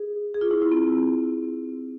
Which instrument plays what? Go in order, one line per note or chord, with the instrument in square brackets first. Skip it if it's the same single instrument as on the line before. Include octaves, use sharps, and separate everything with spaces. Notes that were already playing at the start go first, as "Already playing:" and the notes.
Already playing: [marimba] G#4
G#4
F4
E4
E4
C4